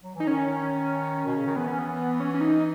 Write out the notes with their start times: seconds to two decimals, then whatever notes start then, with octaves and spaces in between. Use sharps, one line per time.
0.03 F#3
0.15 E3 D#4
0.27 D#3 C#4
1.26 B2
1.36 C#3
1.46 D#3
1.56 E3 B3
1.68 C#4
1.79 B3
2.20 C#4
2.34 C#4
2.41 D#4